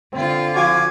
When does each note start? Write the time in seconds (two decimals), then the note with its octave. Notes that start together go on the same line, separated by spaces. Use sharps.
0.13 D3 C4 F4
0.55 F3 F#4 F5 G#5 C#6 D6